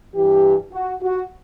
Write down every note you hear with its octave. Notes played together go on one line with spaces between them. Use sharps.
G2 E3 G4
F#4
F#4